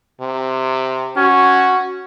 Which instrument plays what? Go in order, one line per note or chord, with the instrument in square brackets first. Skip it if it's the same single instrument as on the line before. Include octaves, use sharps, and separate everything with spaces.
[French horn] C3
[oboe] C#4 [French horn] F#4